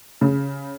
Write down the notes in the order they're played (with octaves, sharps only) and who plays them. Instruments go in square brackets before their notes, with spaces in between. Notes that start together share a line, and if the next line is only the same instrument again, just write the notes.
[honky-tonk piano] C#3